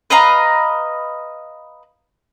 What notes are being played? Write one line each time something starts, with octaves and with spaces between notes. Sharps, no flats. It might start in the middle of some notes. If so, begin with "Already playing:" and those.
B4 D#5 F5 A#5